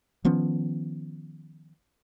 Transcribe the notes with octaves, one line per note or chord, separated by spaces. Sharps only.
D#3 F3 B3 C#4